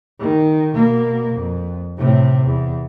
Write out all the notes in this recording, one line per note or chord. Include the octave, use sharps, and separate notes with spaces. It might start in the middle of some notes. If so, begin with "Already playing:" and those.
D#3
B2 A#3
F2
A2 C3
E2